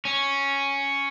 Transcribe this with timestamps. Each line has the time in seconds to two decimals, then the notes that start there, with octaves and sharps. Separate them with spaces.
0.05 C#4